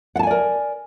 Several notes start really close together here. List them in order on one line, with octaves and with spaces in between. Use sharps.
F#5 A5 G#5 D5 A#4